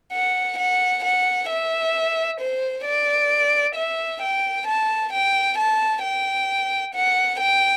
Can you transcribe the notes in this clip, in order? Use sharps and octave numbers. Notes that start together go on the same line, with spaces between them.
F#5
F#5
F#5
E5
C5
D5
E5
G5
A5
G5
A5
G5
F#5
G5